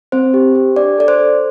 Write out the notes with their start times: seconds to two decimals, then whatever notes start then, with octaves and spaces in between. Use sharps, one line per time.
0.12 C4 C5
0.34 G4
0.55 G4
0.76 D4 D5
0.98 A4 D5
1.08 C5
1.20 A4